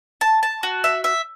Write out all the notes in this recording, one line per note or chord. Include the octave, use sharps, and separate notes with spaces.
A5
A5
F#4
E5
E5